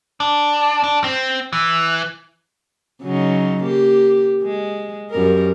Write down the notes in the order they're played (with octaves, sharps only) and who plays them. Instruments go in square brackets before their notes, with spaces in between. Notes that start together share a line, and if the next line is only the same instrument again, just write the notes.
[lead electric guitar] D4
D4
C4
E3
[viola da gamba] C#3 F#3 D#4
A#3 G4
G#3
F#2 G3 A#4